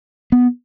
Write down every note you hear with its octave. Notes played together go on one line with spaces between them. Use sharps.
B3